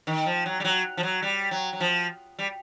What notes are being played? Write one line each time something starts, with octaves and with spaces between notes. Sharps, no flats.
D#3
F3
F#3
G3
F#3
F3
F#3
G3
F#3
F#3
F3
G3